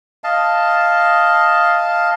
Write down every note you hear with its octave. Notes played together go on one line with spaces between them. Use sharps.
D#5 F5 A5